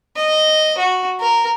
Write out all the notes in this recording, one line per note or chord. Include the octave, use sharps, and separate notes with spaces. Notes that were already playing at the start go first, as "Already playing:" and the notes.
D#5
F#4
A#4